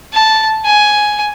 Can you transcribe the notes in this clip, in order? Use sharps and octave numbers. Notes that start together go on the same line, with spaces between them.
A5
G#5